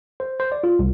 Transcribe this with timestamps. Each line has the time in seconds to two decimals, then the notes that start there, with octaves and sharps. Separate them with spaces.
0.20 C5
0.40 C5
0.52 D5
0.64 F4
0.79 C2